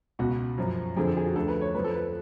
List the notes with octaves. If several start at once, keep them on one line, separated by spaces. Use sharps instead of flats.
C#2 B2 F#4
F#2 F3
F2 D3 F3 G#4
A4
G#4
F#4
D2 D3 F3 A4
B4
C#5
F2 F3 B4
A4
B4